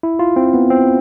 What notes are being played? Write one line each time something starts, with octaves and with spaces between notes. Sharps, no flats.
E4
F4
C4
B3
C4